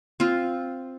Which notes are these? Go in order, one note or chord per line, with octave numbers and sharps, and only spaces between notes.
C4 F4